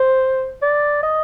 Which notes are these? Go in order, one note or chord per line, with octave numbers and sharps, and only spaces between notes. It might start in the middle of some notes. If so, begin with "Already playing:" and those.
Already playing: C5
D5
D#5